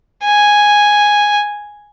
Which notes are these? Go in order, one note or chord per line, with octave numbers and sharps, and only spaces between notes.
G#5